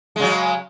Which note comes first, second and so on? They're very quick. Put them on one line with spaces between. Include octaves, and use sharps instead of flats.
G#3 C#3 F#3